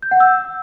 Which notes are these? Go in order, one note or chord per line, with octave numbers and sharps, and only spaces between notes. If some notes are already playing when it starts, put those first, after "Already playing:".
G6
F#5
E6